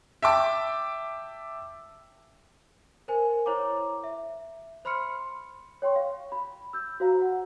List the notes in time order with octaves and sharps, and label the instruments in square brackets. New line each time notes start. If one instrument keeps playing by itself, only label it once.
[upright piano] E5 G5 A5 D6
[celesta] A#4 C5 G#5
E4 C5 C#5 F#5 A#5 D6
E5
C5 B5 C6 F6 C#7
C#5 G5 C6 C#6
F5
B5
E6 G6
F#4 C5 F5 A#5
F#5